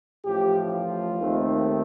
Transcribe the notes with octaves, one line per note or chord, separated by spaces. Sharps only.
A1 A2 F3 G4
F4
D#2 D#3 A3 C4